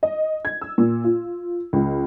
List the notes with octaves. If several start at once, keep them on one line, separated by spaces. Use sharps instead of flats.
D#5
G#6
E6
A#2
F4
C#2